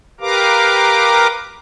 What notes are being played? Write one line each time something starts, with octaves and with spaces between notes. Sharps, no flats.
G4 A#4 B4 F5 A#5 D6